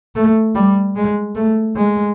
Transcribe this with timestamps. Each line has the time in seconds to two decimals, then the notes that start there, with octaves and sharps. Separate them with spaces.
0.15 A3
0.55 G3
0.96 G#3
1.35 A3
1.76 G#3